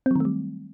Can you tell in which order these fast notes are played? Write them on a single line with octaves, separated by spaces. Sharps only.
C4 F#3 D#3 A3 G3